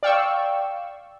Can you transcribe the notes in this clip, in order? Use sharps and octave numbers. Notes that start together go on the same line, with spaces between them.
D5 F5 G5 C#6 E6